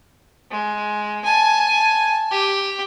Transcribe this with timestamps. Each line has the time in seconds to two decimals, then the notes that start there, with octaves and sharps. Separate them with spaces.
0.51 G#3
1.24 G#5 A5
2.31 G4